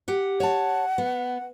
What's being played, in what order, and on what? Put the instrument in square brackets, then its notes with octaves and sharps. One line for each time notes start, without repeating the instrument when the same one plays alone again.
[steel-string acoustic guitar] G4 F#5
[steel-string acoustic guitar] C#5 A5 [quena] F#5
[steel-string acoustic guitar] B3